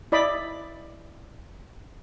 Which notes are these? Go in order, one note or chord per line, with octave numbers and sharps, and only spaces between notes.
E4 D5 D#5 B5